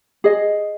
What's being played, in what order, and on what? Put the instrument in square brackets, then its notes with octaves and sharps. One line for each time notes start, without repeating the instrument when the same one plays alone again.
[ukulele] G#4 D#5